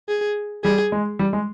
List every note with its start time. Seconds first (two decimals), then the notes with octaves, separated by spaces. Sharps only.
0.08 G#4
0.64 G3 G#4
0.92 G#3
1.19 G3
1.33 G#3